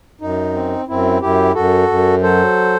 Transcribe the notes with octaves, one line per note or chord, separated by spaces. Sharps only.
F#2 D#4
C4
F#2 C4 E4
F#2 E4 G4
F#2 F#4 A4
F#2
F#3 A4 C5